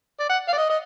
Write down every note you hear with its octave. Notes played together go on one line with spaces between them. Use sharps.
D5
F#5
F5
D5
D#5
D#5